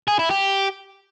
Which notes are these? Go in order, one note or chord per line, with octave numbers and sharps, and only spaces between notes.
G#4
E4
G4